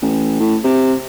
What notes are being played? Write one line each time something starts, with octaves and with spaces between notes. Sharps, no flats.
A1
A2
C3